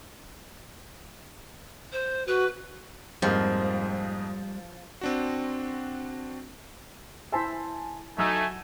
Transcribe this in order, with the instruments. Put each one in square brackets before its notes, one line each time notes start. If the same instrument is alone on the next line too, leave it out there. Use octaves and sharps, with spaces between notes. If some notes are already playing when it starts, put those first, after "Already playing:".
[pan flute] C5
[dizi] F#4 [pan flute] B4
[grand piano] F2 G#2 A#3 [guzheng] F3 [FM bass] G3
[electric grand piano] C4 D4 F#4
[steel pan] E4 C5 E5 [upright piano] G#5 A5 C6
[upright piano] F#3 E6 [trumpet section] A3 D#4 [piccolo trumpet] G#5